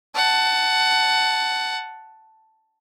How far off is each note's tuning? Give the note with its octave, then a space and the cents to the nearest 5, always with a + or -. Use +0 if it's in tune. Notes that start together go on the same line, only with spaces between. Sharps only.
F#5 +15 A5 +0